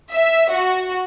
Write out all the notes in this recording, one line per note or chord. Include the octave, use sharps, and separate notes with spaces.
E5
F#4